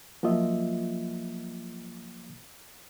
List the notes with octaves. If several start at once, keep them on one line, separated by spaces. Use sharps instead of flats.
F3 F#3 A#3 F4 D#5 E5